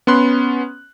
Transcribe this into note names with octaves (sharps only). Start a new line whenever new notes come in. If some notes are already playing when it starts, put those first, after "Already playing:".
B3 C#4 B5 C6 F#6